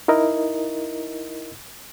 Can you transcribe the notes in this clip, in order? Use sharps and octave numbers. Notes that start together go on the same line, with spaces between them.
D#4 E4 A#4 D#5